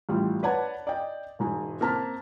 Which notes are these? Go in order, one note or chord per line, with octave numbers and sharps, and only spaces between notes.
A1 G3 F4
B4 C#5 D5 F#5 A5 G#6
D5 D#5 G5
E1 G#2 G#5
A#3 C4 A5 A#5 F6 B6